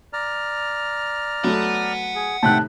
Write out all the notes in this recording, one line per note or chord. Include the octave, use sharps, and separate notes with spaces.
D5 A#5 F6
F#3 A3 F#5 B5
G#4
A2 C3 D#3 E5 G5 A5 F#6